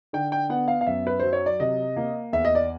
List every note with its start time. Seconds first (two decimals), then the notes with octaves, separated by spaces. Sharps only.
0.13 D3 G5
0.32 G5
0.49 B3 F#5
0.68 F5
0.81 F5
0.87 F#2 E5
1.07 B4
1.19 F#3 C5
1.33 C#5
1.46 D5
1.60 C3 D#5
1.97 A#3
2.33 E2 E5
2.45 D#5
2.55 D5